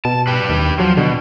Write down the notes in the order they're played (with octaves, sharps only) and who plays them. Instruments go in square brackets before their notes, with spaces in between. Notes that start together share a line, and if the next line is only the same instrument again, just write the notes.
[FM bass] B2 [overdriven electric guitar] A5
[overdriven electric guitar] G4 B4
[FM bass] D#2
[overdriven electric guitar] F3 [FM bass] F#3
[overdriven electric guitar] B2 [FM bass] D3